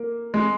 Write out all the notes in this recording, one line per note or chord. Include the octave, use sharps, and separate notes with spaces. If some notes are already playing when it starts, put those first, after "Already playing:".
Already playing: A#3
G#3